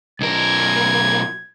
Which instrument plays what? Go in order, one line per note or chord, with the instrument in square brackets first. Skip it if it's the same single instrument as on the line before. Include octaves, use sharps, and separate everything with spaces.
[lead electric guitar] B1 A#4 [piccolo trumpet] G#6